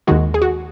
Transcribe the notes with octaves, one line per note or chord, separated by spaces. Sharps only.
D#2 D#3 G#3 F#4
G#4
F#4